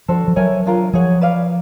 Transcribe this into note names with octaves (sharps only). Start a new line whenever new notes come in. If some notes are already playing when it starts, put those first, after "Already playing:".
F3 D4 F#4 A4 C5
F3
F#3 A#4 C#5 E5 G#5
D4 F4 A#4
F3 G#4 C#5 F#5
B4 D5 F5